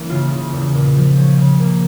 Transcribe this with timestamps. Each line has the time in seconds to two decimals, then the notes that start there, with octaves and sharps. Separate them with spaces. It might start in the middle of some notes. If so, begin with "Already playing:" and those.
Already playing: E3 A#3 C#4
0.10 C#3 F4
0.31 C#3
0.53 E2
0.74 A#2
0.96 F3
1.17 C#4
1.37 C#3
1.59 A#3